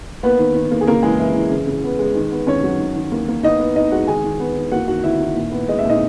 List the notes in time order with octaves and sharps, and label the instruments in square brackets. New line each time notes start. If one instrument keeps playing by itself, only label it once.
[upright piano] A#3 B3 B4
D#3
D#3
A#3
G#4
C#3 A#3 A#4
E3 G#3 G#4
E3 E4
E3
C#3
C#3
B3
G#3
D#3
B3
D#3 C#4 C#5
F#3
D#3
D#3
A#3
A#3
B3 D#4 D#5
B3
B3 D#4 D#5
G#3 F#4 F#5
D#3 G#4 G#5
D#3
B3
D#3
A#3 F#4 F#5
D#3 F#4 F#5
D#3 E4 E5
D#3
A#2
B3
G#3 D#5
E5
A#2 D#4 D#5